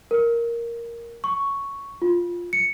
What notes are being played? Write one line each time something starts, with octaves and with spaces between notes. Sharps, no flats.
A#4
C#6
F4
C#7